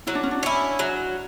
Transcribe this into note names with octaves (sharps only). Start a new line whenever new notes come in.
F#3 E4
D4
C#4
D4
C#4 E4
F#3